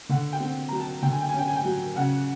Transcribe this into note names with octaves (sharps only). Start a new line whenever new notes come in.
D3 F#5
G5
C4
F#3 A#5
A5
D3 G5
G#5
G5
G#5
C#4 G5
G#5
G5
F#3
C#3 F#5